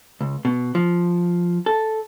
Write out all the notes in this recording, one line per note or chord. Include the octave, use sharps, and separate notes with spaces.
C#2
B2
F3
A4